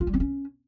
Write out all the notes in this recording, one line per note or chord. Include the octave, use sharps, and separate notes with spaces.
F4
G3
C4
C#4